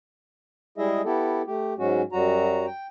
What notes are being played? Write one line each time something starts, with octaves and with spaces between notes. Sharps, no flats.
G3 G#3 E4 G#4 D#5 E5
B3 E4 G4 A4
A3 G4
G#2 F#3 G#3 C#4 F#4
F#2 F#3 G3 F#4 A#5
G5